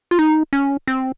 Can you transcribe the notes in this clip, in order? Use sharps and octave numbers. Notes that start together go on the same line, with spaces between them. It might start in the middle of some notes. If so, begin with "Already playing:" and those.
F4
D#4
C#4
C4